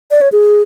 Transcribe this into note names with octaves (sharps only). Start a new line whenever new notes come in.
D5
C#5
G#4